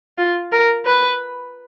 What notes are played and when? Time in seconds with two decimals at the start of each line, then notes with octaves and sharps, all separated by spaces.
0.18 F4
0.52 A#4
0.85 B4